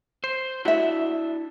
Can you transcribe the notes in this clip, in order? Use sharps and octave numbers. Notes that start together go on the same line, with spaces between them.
C5
D4 E4 F#4 E5